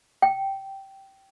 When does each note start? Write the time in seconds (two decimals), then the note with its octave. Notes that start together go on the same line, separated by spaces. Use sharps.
0.22 G5